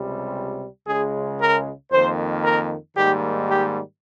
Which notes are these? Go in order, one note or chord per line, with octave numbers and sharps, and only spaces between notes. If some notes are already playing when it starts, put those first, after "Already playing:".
Already playing: C#2 C3 G3
C#2 C#3 G#3 G#4
A#4
F2 D#3 A#3 C5
A#4
G#2 D#3 G3 A#3 G4
G4